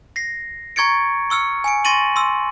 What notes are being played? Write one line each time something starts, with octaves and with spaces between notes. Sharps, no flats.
A#6 C7
A#5 C#6 G#6 A6 C#7 D7
C#6 E6 F6 C#7
G#5 C#7 D7
C6 C#6 A6 A#6 D#7 F#7
C6 E6